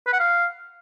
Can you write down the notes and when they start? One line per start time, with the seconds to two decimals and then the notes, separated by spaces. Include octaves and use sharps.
0.06 B4
0.13 F#5
0.19 F5